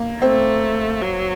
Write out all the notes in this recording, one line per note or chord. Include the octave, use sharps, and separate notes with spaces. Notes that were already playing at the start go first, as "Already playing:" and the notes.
Already playing: A#3
A3 C4
F#3